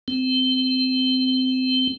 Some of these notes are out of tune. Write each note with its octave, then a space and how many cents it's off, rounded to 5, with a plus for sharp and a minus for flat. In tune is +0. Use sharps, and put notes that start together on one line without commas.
C4 -20